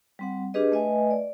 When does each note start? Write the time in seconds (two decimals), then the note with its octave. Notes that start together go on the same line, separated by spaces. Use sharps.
0.19 G3 C4 F#5
0.54 D4 G4 G#4 B4 D#5
0.72 A3 B4 D#5 E5 G#5
1.11 D5